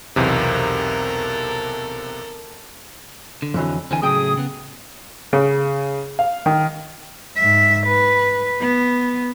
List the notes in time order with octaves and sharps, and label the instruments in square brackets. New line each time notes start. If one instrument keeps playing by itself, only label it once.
[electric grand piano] B1 E2 C3 [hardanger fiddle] A4 A#4
[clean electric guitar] D3
[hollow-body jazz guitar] F2 E3 F#3
[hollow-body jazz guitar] D2 G#5 [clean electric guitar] D3 E3 C4
[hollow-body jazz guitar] A2 G5 [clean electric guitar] C#3 F#3 [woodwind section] G#4 D#6
[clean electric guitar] C#3 B3
[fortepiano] C#3
F5
D#3
[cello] G#2 E5
B4
B3